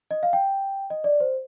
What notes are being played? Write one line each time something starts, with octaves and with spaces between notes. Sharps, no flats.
D#5
F5
G5
D#5
D5
C5